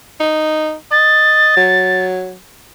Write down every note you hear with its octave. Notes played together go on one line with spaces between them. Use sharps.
D#4
D#5 A6
F#3